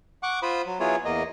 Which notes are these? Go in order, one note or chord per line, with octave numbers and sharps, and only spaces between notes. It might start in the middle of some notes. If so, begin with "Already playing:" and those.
F#5 C#6 D6
F4 C5 B5 D#6
F#3
F#3 B3 E4 F4 G#4 C#5
E2 A#3 D#5